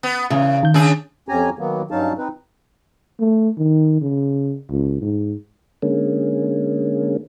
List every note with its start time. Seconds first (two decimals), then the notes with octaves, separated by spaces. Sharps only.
0.03 B3
0.30 E2 C#3
0.63 D#3 G6
0.74 C#3 D4 G#4
1.29 F2 C#4 G4 G#5 A#5
1.59 D#3 F#3 A#3 B3
1.91 G2 F#3 C#4 D#4 F5 A5
2.18 C4 D#4 B4
3.19 A3
3.57 D#3
4.01 C#3
4.70 C#2
5.02 G#2
5.82 D3 G#3 A#3 C#4